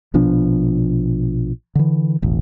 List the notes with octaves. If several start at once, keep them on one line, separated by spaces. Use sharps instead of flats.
A#1 B2 F3 D4
D3 E3
E1 A1